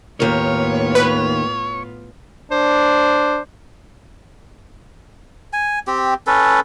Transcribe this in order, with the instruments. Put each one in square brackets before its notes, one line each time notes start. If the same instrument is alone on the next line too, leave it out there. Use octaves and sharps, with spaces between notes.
[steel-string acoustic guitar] D#2 A#4 [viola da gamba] A2 B3 F4 [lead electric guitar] C#5
[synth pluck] B4
[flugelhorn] D4 [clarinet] C5
[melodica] G#5
C4 G4
C#4 A4 B4